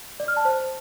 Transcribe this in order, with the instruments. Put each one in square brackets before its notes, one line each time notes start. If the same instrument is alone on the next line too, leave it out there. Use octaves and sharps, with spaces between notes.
[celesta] D5
F6
A5
C5